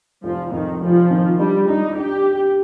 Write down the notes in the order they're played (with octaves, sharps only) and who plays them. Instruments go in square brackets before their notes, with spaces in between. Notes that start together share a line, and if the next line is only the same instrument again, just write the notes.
[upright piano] F1 [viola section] F3
[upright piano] F2 [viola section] D#3
[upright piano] F1 [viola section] F3
[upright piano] D#3
[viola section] G3 [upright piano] D4
[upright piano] D4 [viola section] D#4
[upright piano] D4 [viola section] G4